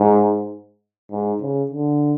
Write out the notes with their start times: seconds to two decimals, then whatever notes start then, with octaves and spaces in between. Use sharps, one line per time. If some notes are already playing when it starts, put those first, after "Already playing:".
Already playing: G#2
1.11 G#2
1.41 C#3
1.72 D3